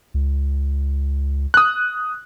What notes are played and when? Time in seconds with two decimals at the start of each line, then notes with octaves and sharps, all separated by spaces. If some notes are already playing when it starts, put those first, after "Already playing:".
0.14 C#2
1.54 D#6 F#6